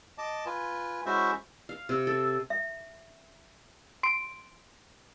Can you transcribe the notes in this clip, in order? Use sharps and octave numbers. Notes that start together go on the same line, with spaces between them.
D#5 A5 D6
F4 B4 G#5
G#3 C#4 E4 F#4 C5 E5
F5
C3
A4
E5
C6 D7